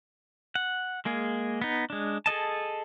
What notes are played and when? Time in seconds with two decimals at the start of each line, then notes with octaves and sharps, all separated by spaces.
0.55 F#5
1.05 G#3 A#3 G#4
1.62 B3 D#4
1.90 G#3 D4
2.26 G#4 A4 D#5 A5